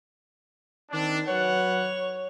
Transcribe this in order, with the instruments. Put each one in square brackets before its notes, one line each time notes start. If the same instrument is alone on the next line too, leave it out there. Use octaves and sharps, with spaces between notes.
[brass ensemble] D#3 C4 D4
[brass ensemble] F#3 B4 F#5 [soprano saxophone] C#5